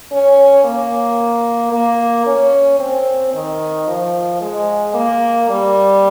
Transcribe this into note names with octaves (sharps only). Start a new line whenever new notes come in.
C#4
A#3
A#3
C#4
C4
D#3
F3
G#3
A#3
G3